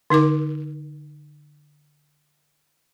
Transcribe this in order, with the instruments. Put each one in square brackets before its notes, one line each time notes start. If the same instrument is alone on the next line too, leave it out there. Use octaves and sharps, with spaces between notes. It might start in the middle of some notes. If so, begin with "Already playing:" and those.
[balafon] D3 D#4 A#4 D6